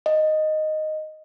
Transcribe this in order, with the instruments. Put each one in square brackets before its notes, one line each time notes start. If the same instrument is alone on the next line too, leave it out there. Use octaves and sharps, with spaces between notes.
[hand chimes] D#5